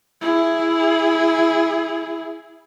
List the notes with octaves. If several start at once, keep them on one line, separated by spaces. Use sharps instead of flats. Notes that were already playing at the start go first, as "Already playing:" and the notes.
E4 G#4